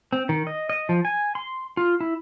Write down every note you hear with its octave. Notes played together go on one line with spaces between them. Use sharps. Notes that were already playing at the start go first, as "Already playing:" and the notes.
C4
D#3
D#5
D#5
F3
G#5
C6
F4
E4